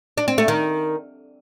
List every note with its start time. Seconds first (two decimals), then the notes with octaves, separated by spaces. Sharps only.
0.18 D4
0.28 C4
0.38 A3
0.48 D#3